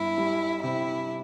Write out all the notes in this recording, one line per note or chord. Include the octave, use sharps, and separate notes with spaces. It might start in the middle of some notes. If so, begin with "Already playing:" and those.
Already playing: G1 E4
G3
C3 E4